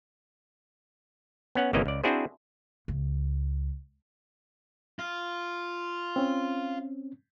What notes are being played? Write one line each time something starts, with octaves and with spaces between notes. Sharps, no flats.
B3 C#4 F#5
G1 C3 E3 A#3 C#4 D#5
C#2 D5
C4 D4 E4 F#4 G#4 C5
C#2
F4
C4 C#4